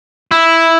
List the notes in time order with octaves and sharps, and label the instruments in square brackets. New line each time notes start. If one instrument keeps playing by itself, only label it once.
[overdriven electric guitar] E4